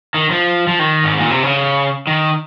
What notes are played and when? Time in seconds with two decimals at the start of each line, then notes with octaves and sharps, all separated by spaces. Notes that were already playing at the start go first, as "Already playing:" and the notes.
0.14 D#3
0.31 F3
0.67 F3
0.79 D#3
1.04 G#2
1.18 A#2
1.31 C3
1.43 C#3
2.07 D#3